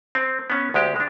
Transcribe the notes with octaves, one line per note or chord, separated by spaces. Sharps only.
C4
B3 C#4
D2 G#3 G4
G#3 D4